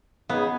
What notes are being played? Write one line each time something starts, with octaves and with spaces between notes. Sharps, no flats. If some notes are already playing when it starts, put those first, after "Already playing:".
C#2 C#3 G#3 B3 D#4 G#4